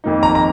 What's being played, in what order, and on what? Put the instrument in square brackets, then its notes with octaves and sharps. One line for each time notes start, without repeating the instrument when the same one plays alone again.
[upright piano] F2 D#3 A#3 D#4
[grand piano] A#5
A#5